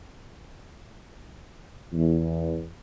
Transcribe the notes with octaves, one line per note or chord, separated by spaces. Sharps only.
E2